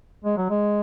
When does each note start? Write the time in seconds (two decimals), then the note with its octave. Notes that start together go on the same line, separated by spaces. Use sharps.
0.25 G#3
0.37 F#3
0.50 G#3